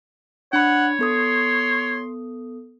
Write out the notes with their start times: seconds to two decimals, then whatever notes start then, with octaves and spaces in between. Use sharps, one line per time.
0.53 D4 C#5 F#5 B5
0.99 B3 A4 C6 D#6